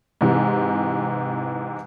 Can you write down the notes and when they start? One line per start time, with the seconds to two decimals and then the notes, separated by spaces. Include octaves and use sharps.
0.21 G#2 C3 E3